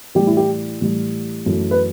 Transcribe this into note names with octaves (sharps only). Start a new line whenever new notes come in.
A2 E3 G3 G4
E4
G4
A2 E3 G3
F#2 E3 A3
B4